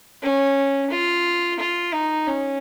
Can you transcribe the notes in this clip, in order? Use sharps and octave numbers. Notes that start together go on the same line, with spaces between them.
C#4
F4
F4
D#4
C#4